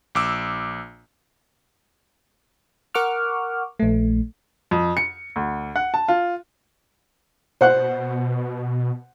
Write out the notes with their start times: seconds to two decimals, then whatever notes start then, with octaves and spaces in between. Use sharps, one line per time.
0.15 A#1 D6 E6
2.95 A#4 F#5 C#6 D6 F6
3.79 A#1 A3
4.71 F2
4.97 C#7
5.36 D2
5.76 F#5
5.94 A5
6.08 F4
7.61 B2 C5 F#5 F#6